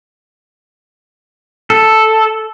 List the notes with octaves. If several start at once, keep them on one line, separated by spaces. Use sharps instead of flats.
A4